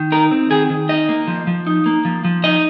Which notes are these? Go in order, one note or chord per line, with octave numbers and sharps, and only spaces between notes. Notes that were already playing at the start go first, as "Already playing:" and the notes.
Already playing: D#3
D#4 A#4
C4
D#3 G#4
D#3
D#4 D#5
A#3
F3
F3
D#4
A#3
F3
F3
D#4 D#5